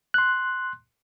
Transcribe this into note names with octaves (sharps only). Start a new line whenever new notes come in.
C6 F#6